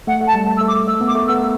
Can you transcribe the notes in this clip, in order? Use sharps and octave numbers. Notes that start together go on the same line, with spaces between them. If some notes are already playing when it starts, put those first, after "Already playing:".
A3 F#5
A3
A5
G3
A3
E6
A3
D6
A3 E6
B3
D6
A3
B3 E6